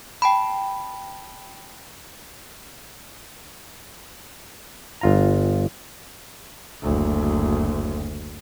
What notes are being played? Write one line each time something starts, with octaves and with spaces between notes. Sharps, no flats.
G5 A5 B5
G1 F4 A#5
F#1 D2